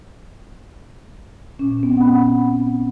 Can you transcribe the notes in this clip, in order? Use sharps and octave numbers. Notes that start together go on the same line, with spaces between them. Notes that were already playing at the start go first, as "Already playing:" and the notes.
A#2 C#4
B3 C4
F#5 B5